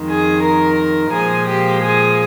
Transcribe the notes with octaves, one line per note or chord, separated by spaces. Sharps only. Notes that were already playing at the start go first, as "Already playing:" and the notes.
Already playing: F2 D#3 G#3
G#4
A#4
A#2 F3 G#3 G#4
G4
G#4